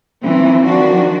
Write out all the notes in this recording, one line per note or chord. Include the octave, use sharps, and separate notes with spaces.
D#3 E3 C4
D#3 F3 D4 F#4